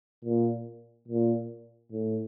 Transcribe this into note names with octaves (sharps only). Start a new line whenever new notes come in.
A#2
A#2
A2